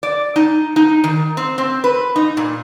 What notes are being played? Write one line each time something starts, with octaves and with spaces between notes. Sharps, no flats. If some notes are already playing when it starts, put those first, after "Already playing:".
D5
D#4
D#4
D#3
C4
C4
B4
D#4
A#2